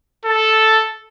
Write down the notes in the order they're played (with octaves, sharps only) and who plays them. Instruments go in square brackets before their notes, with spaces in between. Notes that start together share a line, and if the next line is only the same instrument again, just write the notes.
[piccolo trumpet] A4